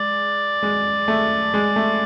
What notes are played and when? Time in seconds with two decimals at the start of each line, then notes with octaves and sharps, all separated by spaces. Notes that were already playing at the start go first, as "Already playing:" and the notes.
Already playing: G#3 D5
0.63 G#3
1.08 A3
1.54 G#3
1.76 A3